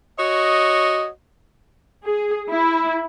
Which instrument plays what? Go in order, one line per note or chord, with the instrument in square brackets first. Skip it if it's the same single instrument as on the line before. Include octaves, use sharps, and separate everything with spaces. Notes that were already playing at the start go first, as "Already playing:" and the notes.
[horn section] F#4 C#5 D#5
[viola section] G#4
E4